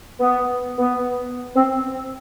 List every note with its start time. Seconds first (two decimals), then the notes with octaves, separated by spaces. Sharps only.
0.20 B3
0.78 B3
1.56 C4